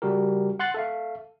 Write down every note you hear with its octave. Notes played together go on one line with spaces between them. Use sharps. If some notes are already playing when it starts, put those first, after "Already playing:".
C#3 G3 F#4 G4 A#4
F#5 C6 F#6 A6
A4 E5 F5